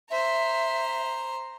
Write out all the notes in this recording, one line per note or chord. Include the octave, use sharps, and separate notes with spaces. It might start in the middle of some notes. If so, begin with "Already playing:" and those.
C5 E5 A#5